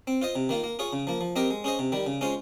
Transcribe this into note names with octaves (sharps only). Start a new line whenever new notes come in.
C4
F4 C5 D#5
C3
D#3 A#3 F4
A#3
F4 G#4 C#5
C#3
F3 A#3
F3
C4 G4 A#4 D#5
G#3
C#4 G#4 C5 D#5
C3
D#3 G3
C#3
G#3 C#4 F4 C5